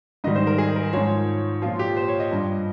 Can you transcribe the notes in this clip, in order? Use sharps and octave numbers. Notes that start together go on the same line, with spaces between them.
G#2 D#3 G3 D#5
C5
A#4
G#4
A#4
G#2 F3 C#5
A#2 F3 F4
G4
C5
C#5
D#5
G2 F3